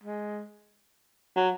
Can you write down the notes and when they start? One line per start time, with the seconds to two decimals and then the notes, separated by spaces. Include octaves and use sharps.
0.03 G#3
1.36 F#3